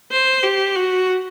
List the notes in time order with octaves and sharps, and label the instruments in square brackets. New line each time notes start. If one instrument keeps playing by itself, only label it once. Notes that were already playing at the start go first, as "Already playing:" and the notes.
[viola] C5
G4
F#4